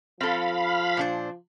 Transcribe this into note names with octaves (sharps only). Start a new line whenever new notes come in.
F3 C4 A4 F5 B5
A#2 D4 C5